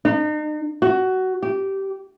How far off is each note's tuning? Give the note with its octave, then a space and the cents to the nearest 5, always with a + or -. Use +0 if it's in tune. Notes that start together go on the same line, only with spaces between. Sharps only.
D#4 -40
F#4 +15
G4 -15